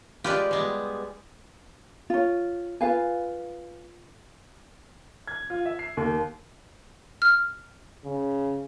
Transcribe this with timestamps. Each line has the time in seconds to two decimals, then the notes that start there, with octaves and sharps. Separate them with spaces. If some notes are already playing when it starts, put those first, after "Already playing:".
0.24 G#3 F4 G4 B4 D5
0.51 G3 G#3 B3
2.10 F4 C#5
2.81 F4 B4 F5 G#5
5.27 G#6
5.50 F4
5.66 E5
5.79 C7
5.97 D#2
7.22 F6
8.05 C#3